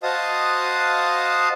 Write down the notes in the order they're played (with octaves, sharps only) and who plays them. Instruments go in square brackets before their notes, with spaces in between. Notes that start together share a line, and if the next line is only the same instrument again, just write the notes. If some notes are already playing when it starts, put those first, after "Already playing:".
[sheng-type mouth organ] F#4 C5 D#5 F5 A5 D#6